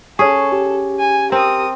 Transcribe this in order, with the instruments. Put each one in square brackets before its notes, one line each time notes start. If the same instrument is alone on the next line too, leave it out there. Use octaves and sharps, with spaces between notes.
[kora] C#4 G#4 [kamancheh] A4 [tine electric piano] C#6
[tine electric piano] G4
[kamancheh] G#5
[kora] C4 [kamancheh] A#4 D#6